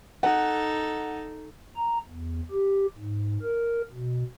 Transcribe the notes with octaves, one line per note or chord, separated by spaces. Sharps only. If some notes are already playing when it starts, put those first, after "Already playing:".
D#4 A4 F#5
A#5
E2
G4
G#2
A#4
B2